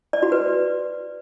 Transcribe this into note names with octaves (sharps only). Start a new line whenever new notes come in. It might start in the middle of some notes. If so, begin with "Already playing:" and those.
D5
F#4
B4